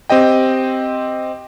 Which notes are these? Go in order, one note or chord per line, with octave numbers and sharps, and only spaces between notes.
C4 G4 D#5 G5